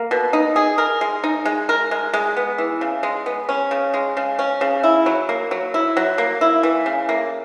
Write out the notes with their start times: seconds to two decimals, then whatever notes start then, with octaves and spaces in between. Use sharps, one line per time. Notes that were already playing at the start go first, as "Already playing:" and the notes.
Already playing: A#3
0.11 B2
0.33 D#4
0.56 G#4
0.78 A#4
1.01 G#3
1.24 D#4
1.45 G#3
1.69 A#4
1.91 G#3
2.14 G#3
2.37 B3
2.58 E3
2.81 C#3
3.03 G#3
3.26 B3
3.49 C#4
3.71 C#3
3.94 G#3
4.17 C#3
4.39 C#4
4.61 C#3
4.83 E4
5.06 F#3
5.29 A#3
5.51 F#3
5.74 E4
5.97 F#3
6.18 A#3
6.41 E4
6.63 E3
6.86 C#3
7.09 A#3